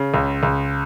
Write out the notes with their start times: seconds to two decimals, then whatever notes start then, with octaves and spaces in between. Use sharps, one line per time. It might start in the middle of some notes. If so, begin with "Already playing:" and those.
Already playing: C#3
0.14 C#2
0.43 C#2